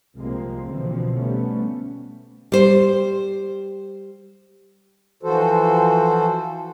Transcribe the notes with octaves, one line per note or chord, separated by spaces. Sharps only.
C2 A#2 F3 G#3 A#3 C4
B2 D3 E3 F3 C4
G3 A3 B3 C#4
G3 C5
E3 F3 F#4 A4 C5